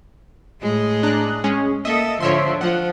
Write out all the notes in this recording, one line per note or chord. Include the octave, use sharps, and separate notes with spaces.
A2 G#3 G#4
D4 A#5 F#6
G#3 C#4 G#4
A#3 A4 D#5 E5 D#6
G#2 D3 F3 C#5 E5 C6
F3 F#5